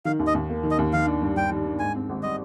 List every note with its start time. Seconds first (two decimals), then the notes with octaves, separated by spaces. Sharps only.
0.05 D#3 F5
0.19 D#2
0.27 D#5
0.35 D#2
0.50 A#3
0.63 D#3
0.71 D#5
0.79 D#2
0.93 D#3 F5
1.07 D4
1.21 G2
1.36 G3 G5
1.51 D#3
1.66 D4
1.79 G#2 G#5
1.95 C4
2.09 G#1
2.23 G3 D#5